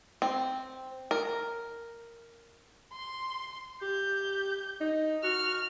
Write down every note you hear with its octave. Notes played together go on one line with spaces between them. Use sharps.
C4
A#4
C6
G4 G6
D#4
F#4 F6